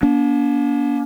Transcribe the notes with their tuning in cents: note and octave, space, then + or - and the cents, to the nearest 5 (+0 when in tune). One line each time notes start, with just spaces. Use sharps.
A#3 +40 D4 -40